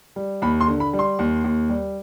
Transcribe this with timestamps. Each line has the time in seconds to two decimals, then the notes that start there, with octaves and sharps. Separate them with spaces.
0.16 G3
0.42 D#2 B5
0.61 C6
0.68 D3
0.80 B5
0.93 G3
0.99 C6
1.19 D#2
1.44 D#2
1.70 G3